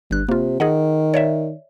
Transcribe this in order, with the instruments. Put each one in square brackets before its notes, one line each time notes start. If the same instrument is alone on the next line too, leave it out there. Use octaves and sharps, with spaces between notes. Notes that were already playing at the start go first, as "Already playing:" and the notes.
[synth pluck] G1 F#6 [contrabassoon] G2
[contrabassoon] C3 [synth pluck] A#3 F4
[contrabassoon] D#3 [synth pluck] G#4 D#5 F#5
[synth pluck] C#5 D5 E5